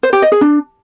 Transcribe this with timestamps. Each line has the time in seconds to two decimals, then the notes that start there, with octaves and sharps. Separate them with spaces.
0.03 C5
0.13 G4
0.22 D#5
0.32 G#4
0.41 D4